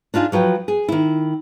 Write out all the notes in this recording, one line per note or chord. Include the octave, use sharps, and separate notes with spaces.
D4 D#4 F4 F#4 G#4
F3 F#3 B4 G5
G#4
D#3 E4